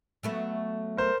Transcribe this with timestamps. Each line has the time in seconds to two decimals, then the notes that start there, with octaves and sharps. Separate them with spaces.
0.23 F#3 A3 B3
0.97 A#4 C5